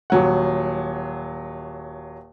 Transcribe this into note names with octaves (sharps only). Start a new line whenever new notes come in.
D#1 F#3 F#5